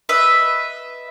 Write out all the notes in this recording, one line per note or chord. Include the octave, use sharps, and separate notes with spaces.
B4 D#5 E5